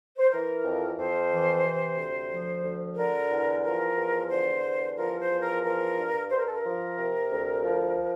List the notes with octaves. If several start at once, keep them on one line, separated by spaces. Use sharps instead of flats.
C5
E3 A#4
F2
F2 C5
E3
C3
D2
F3
D2
D3 A#4
E2
F3 A#4
E2
D3 C5
E2
F3 A#4
C5
E2
A#4
F3 A#4
G2
G2 C5
A#4
A4
A#4
F3
C3
D2
F3